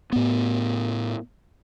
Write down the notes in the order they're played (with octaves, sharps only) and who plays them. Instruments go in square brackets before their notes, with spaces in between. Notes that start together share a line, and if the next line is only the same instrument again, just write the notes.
[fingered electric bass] A2 B3